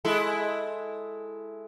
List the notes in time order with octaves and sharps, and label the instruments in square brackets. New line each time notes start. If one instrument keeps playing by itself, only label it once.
[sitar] G#3 E4 A4